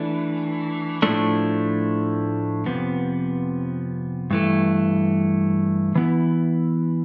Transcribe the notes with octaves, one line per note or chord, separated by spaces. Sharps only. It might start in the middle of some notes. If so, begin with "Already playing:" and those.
Already playing: E3 A3 D4
A2 F3 A3 D4
F2 C3 F3 B3
G2 E3 A3
E3 B3 E4